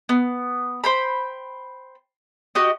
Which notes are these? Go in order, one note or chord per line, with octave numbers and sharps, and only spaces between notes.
B3
C5 G5 B5
F#4 G4 D#5